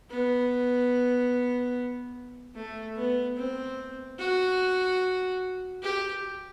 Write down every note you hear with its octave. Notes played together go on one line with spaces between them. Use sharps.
B3
A3
B3
C4
F#4
G4